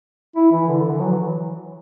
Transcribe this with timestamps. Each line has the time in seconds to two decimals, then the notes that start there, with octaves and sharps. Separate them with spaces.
0.36 E4
0.52 E3
0.68 D3
0.79 D3
0.90 E3
1.00 F#3
1.11 E3